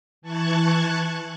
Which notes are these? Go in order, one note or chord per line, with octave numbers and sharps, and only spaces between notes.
E3 A5 C#6 F#6 G#6